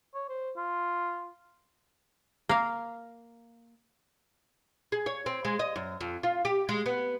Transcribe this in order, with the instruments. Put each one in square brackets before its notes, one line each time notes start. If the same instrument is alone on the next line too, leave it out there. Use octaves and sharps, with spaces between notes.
[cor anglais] C#5
C5
F4
[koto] A#3 F5
[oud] G#4
C#5
C4
G#3
D#5
F#2
F2
F4
G4
G#3
B3